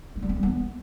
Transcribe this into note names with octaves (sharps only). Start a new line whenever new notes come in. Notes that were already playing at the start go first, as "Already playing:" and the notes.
G#3
G3
C4
G3
B3